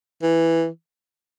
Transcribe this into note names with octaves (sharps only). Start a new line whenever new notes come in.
E3